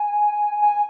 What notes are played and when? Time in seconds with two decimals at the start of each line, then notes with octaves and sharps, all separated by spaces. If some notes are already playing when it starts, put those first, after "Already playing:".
Already playing: G#5
0.62 G#5